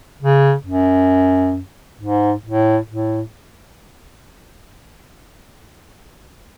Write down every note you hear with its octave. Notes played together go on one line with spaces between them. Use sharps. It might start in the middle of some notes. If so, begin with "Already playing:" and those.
C#3
F#2
G#2
A2
A2